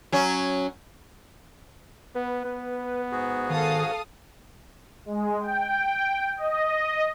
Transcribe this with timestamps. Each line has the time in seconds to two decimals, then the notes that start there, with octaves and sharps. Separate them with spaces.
0.12 F#3 C#4
2.15 B3 B4
2.45 B3
3.12 G#2 F#4 G#4
3.50 D#3 A4 F5 D#6
5.06 G#3
5.40 G5
6.37 D#5